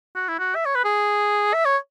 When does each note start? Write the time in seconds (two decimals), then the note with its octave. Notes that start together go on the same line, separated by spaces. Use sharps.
0.16 F#4
0.29 E4
0.39 F#4
0.56 E5
0.66 C#5
0.75 B4
0.85 G#4
1.54 E5
1.65 C#5